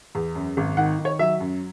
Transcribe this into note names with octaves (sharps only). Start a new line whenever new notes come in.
E2
F#2
G#1
D#3 F#5
D#3
C#5
F#3 E5
F#2